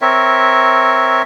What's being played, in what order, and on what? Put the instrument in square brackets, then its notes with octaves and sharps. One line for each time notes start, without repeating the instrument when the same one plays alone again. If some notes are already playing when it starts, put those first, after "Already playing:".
[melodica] C4 A#4 C#5 E5